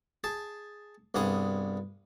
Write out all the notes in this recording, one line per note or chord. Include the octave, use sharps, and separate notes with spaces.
G#4 A5
C2 G2 B3 G#4 D#6